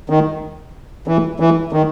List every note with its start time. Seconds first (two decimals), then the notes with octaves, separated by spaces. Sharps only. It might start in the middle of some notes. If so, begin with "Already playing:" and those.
0.10 D#3
1.08 E3
1.40 E3
1.73 D#3